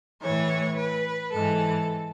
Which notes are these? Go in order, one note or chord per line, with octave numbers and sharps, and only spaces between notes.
A2 E3 C#5
B4
G#2 E3 A4